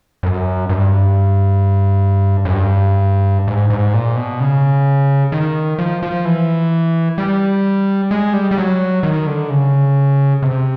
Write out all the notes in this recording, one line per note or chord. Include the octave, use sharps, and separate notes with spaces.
F#2
G2
F#2
G2
G#2
G#2
A#2
B2
C#3
D#3
F3
F3
E3
G3
G#3
G3
G3
F#3
D#3
D3
C#3
C3